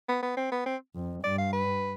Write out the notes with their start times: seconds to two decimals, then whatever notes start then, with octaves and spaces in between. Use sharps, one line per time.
0.09 B3
0.23 B3
0.37 C4
0.52 B3
0.66 C4
0.95 F2
1.24 G2 D5
1.38 F5
1.53 B4